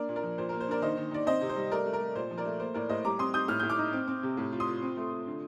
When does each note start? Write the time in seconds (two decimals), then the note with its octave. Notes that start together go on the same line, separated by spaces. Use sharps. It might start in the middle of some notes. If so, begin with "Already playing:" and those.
Already playing: A#3 D4 A#4 D5
0.09 A#2
0.16 A#4 D5
0.23 F3
0.38 A#2 C5
0.49 A#3 A#4
0.60 C5
0.68 D4 A#4 D5
0.82 D#3 C5 D#5
0.97 D#3
1.11 D#3 D5
1.27 C4 C5 D#5
1.41 C3
1.49 C5
1.56 G3
1.71 A3 A#4 D5
1.86 A3
1.93 A#4
2.00 A3
2.15 A#2 C5
2.31 F3
2.37 A#4 D5
2.45 A3
2.60 A#3 C5
2.74 A2 A#4 D5
2.89 A2 C5 D#5
3.05 G3 A#5 D6
3.19 C4 C6 D#6
3.34 D#4 D#6 G6
3.48 A2 F6
3.60 A2 G6
3.70 D6 F6
3.78 D#4
3.93 C4
4.08 C4
4.23 C3
4.37 A2
4.52 F4
4.60 C6 D#6
4.67 F4
4.82 C4
4.97 A3
5.12 F4
5.27 D3